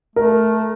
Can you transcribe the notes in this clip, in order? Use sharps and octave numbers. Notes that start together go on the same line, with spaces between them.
A3 A#4